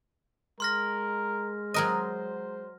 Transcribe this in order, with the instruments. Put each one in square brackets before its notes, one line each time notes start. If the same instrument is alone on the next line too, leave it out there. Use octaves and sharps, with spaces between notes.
[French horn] G#3 [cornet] A#4 [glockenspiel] C6 F6 A#6
[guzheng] F#3 A#4 D#5 [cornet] C5